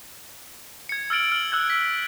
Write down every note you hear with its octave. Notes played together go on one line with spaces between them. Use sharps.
G#6 C#7
E6 F6 A6 D7 F#7
F6 F#7
E6 F#6 G#6
B6